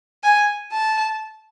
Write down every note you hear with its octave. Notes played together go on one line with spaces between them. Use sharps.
G#5
A5